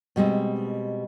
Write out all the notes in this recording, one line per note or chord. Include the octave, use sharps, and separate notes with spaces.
B2 G3 G#3 C4